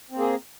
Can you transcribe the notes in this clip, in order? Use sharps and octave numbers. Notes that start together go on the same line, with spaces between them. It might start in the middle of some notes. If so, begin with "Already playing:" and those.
A#3 C4 G#4